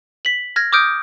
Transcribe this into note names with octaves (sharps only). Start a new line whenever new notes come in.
B6 F#7
F6 G#6 A#6
D6 D#6 F6 G6 D7